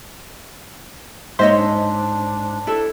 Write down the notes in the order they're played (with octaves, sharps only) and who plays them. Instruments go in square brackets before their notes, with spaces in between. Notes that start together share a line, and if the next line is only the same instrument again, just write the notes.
[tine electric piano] G#2 C5 C6 [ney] A#3 [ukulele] C#5 D#5 E5
[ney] D4
[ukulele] E4 A4